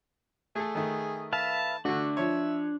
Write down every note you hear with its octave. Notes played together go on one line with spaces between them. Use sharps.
A3 G#4 A4
D#3 A3
B4 E5 F5 A5
D3 A3 D4 F#4
F3 C#5 E5